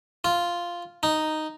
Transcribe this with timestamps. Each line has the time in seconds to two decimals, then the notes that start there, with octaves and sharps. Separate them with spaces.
0.24 F4
1.03 D#4